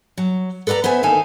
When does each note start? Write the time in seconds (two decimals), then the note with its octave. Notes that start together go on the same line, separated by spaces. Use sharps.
0.18 F#3
0.67 A4 B4 D5 F5 A#5
0.84 B3 C5 E5 G#5
1.03 D2 D#3 D#4 A4 F5 G#5